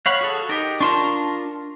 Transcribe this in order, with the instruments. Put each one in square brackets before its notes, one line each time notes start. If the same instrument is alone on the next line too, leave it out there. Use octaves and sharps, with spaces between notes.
[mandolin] C#5 [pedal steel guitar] F5 F#5 B5
[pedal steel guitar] F#4 G#4 A4
[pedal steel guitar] D#4 [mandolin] G4 A#4
[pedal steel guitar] D4 F4 A#4 [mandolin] A5 C6 C#6